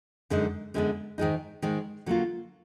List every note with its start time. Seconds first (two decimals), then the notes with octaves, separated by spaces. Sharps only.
0.30 F#2 D3 G#3 D#4
0.74 F#2 D3 G#3 B3
1.18 G#2 D#3 G#3 D#4
1.62 G#2 D#3 G#3 D#4
2.06 D3 F#3 A#3 F4